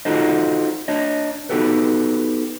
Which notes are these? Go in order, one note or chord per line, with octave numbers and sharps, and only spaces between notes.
D#4 F4 F#4 A4 C5 D#5
D4 C#5 D#5
B3 D#4 F#4 G4 A4 B4